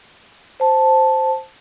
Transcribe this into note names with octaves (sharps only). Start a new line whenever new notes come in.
C5 A5